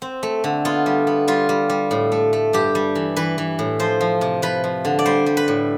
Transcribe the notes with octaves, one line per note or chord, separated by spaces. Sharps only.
C4
A3
D3
B3 F4
G3
B3
G3 F4
G3
G3
A2
A3
A3
G2 G4
G3
E3
E3 B4
E3
A2
F3 C5
F3
C3
F3 B4
F3
D3
D5
G3 C5
G3
B4
A2